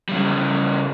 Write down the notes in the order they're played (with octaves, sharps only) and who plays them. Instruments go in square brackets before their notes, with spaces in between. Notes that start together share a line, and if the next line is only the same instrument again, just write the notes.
[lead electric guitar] C#3 G3